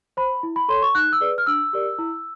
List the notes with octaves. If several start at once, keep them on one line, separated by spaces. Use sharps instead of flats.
C5 B5
E4
B5
A4 C#5 C6
C#6
D#4 F#6
E6
G#4 B4 D5
F6
D4 E6
G4 A#4 D5
E4